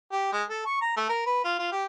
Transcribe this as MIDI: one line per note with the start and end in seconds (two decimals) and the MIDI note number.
0.12 0.32 67
0.32 0.43 56
0.50 0.62 69
0.66 0.80 85
0.82 0.93 82
0.97 1.07 57
1.09 1.26 70
1.26 1.44 71
1.44 1.55 65
1.59 1.72 65
1.72 1.85 67